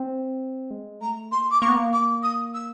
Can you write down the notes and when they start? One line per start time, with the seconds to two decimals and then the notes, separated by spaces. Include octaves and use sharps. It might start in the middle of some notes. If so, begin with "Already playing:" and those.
Already playing: C4
0.71 G#3
1.01 A3 A#5
1.31 A#3 C6
1.51 D6
1.61 A#3 C#6
1.69 B3
1.76 A#3
1.93 D6
2.23 D#6
2.54 E6